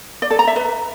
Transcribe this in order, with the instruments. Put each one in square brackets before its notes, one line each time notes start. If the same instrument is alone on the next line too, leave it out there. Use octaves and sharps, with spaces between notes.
[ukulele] D5
A4
A#5
E5
B4